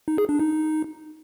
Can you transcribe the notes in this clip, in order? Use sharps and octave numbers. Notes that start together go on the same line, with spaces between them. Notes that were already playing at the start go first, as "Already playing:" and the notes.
D#4
G#4
D4
D#4